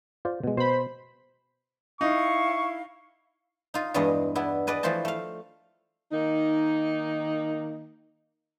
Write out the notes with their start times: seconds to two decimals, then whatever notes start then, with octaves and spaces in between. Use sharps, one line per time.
0.25 F4 C5 D5
0.44 B2 G#3
0.57 B2 C5 B5
2.01 D#4 E4 F5 C#6
3.74 D#4 F4
3.94 E2 G2 E3 G#3 D4 D#5
4.35 B3 D4 E4
4.67 G#4 B4 D5 D#5
4.83 E3 F3 A3 C5 A5
5.05 A3 F5
6.12 D#3 A#3 D#4